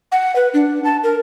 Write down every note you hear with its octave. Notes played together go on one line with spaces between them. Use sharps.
F#5
B4
D4
A5
A#4